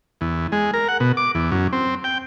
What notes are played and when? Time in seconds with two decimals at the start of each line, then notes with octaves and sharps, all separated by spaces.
0.21 E2
0.52 G#3
0.74 A#4
0.88 F#5
1.00 B2
1.17 D6
1.35 E2
1.52 F#2
1.73 C4
2.04 G5